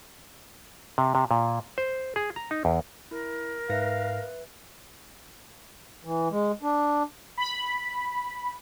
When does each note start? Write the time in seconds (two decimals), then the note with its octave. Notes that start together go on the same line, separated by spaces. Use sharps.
0.98 C3
1.15 C3
1.31 A#2
1.78 C5
2.16 G#4
2.36 A#5
2.51 D#4
2.65 E2
3.11 E4 A#4
3.70 G#2 B4 E5 F5 A#6
6.05 E3
6.31 G#3
6.63 D4
7.38 B5